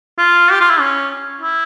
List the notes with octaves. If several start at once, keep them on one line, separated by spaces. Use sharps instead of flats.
F4
G4
F4
E4
C#4
E4